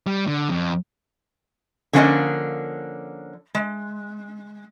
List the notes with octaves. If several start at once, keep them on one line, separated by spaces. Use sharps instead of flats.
G3
D3
F2
D3 F3 A#3 C#4 D4 D#5
G#3